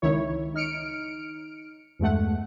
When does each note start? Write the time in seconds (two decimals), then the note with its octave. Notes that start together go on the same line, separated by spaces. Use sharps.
0.02 C#2 D#3 E4 C#5
0.54 D#4 F6 C#7 D7
1.99 E2 G2 G#3 A3 F#5